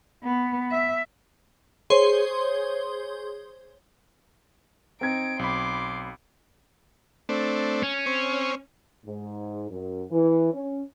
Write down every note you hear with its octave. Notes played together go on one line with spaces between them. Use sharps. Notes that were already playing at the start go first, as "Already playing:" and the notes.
B3
E5
G#4 C5 C#5 C6
C4 D#4 G#6 D7
B1 B5 C6 D6
A3 C4 D4
C#4
C4 C#5
G#2
F#2
E3
C#4